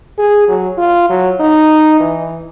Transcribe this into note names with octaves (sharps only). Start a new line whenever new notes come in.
G#4
F#3
F4
F#3
D#4
E3